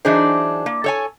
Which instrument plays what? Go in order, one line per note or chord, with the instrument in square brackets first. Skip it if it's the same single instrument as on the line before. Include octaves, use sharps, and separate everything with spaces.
[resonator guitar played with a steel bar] E3 F#3 D4 D#4 G#4 C5
A#3
A4 C#5 G#5